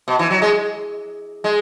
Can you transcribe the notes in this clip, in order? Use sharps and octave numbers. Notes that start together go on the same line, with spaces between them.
B2
E3
F#3
G#3
G#3